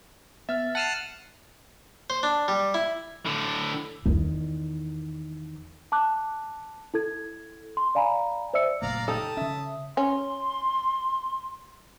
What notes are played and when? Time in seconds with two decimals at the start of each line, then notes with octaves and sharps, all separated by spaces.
0.49 B3 E5 F6 A6
0.75 F#5 A5 F6 A6 C7 D#7 E7
2.10 C5
2.23 D4
2.48 G3
2.74 E4
3.26 A2 D3
4.06 E2 D#3
5.92 A5 D6 F#6
6.94 E4 A4 G#6
7.77 C6
7.95 D5 F5 G#5 A#5 B5
8.54 C5 D5 E5 E6 C#7
8.82 F#1 A#2 A3 D5 F5 A#5
9.08 D#4 G4 A4 A5 D#6
9.37 C#3 C#4 E5
9.97 C#4 C6